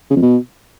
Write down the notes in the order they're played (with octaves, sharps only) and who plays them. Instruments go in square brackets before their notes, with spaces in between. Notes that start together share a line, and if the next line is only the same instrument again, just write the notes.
[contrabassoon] C#3
F2
B2